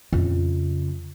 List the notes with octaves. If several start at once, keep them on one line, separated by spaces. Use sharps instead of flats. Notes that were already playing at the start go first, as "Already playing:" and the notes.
F2 C#3